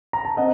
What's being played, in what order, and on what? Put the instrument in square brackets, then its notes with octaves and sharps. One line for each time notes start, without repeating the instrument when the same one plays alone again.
[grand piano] A#5
A5
C4 D#5 F#5